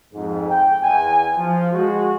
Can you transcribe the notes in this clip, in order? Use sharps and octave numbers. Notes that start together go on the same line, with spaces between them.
F2 G#2
G5
E2 G#5
F3
G#3 F#4